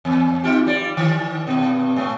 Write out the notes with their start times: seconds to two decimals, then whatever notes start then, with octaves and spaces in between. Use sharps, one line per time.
0.05 E2
0.44 D#4 F4 G4
0.67 G3 D5
0.97 D#3
1.47 G2 B2
1.96 A2 A3